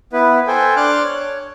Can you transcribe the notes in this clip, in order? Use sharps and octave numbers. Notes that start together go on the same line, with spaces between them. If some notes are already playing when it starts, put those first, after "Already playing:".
B3 E4 B4
A4 C5 G5 G#5
D4 C6 D6 F6 F#6
C#5